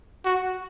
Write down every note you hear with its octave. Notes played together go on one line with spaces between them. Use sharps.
F#4